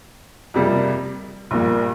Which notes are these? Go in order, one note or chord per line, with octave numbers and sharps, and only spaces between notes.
F2 C3 G3 A#3
A#1 A#2 G3 A#3